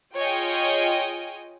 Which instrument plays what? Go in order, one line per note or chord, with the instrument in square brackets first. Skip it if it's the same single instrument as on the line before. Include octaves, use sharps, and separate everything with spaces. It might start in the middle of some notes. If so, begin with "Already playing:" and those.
[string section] F4 G#4 C#5 D#5 G5